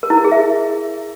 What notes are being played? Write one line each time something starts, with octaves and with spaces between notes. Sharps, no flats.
A#4
E4
A#4
G#4
E5